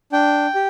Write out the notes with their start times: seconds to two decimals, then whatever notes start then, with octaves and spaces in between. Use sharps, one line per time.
0.12 D4 G5
0.55 G4